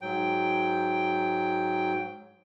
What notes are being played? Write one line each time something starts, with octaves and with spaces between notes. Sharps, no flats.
G#2 F#3 G5